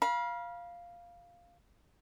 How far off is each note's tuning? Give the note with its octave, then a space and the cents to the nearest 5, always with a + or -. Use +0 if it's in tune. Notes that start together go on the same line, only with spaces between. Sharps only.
F5 +0 B5 -40